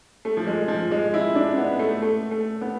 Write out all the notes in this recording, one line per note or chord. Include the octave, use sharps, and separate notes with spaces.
A3
F3
G#3
F3
G#3
E4
D4
B3
A3
A3
A3
B3